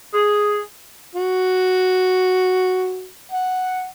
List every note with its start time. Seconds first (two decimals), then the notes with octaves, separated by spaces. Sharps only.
0.14 G#4
1.15 F#4
3.32 F#5